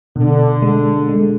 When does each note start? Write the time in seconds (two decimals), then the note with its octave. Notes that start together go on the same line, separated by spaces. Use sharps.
0.16 B2 D3
0.62 G#3
1.09 G#3